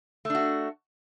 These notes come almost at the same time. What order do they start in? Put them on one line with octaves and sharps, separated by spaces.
A3 D4 F#4